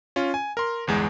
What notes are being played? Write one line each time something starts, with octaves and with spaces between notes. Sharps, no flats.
C#4 F4
G#5
A#4 C6
G1 E2 G#3